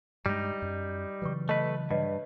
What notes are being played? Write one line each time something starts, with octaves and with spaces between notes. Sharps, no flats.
G2 G3 G#3 D#4
F#2
C#3 E3 F#3 B4 C#6
A3 B4 D#5
G2 B4 C#5 D#5